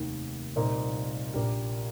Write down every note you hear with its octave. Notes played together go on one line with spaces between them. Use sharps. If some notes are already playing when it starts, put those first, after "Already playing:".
Already playing: F1 D#2 D#3
C2 A#2 A#3 D#4 C5
A#1 A#2 A#3 G4 A#4